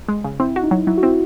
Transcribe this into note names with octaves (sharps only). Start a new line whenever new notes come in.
G#3
C#3
C4 E4
F#4
D#4
F#3
F#3 E4
F#4
C4 E4